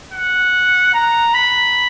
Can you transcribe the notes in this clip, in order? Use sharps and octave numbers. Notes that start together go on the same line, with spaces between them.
F#5
A#5
B5